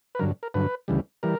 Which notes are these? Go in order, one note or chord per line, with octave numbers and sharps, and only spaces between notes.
B4
G2 D3 F#3 A#4
A#4
G2 D3 F#3 B4
D2 C#3 E3 G3
E3 G3 A#4